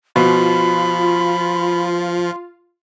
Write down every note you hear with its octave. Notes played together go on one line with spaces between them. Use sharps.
B2 F3 F4 B5